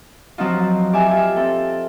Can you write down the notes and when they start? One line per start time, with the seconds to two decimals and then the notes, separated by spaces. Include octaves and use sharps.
0.38 F3 F#3 C4 D#4 F4
0.93 G4 D5 E5 G#5
1.11 F4 E5
1.36 C4 A4